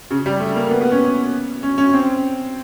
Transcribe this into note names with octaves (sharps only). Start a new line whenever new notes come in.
C#3
G3
A3
A#3
B3
B3
C#4
C#4
C#4
C4